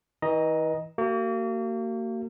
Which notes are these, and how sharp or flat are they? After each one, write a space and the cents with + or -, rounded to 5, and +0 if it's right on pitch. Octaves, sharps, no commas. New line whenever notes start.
E3 -40 D#5 +0 A#5 +15
A#3 -35 F#4 +40